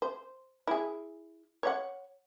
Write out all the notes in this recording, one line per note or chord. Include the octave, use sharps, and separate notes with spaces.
C5
E4 G#4
C#5 D5 F#5